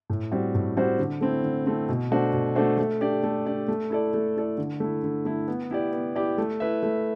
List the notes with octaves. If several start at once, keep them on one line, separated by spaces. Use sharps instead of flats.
A2
G3 C4 F#4 C5
A2
G3 C4 F#4 C5
D3
A3 C4 E4
D3
A3 C4 E4
B2
A3 D4 F#4 C5
B2
A3 D4 F#4 C5
A3
D4 G4 D5
A3
D4 G4 D5
A3
E4 A4 D5
A3
E4 A4 D5
D3
A3 E4
D3
A3 E4
B3
E4 G4 D5
B3
E4 G4 D5
A3
E4 B4 E5
A3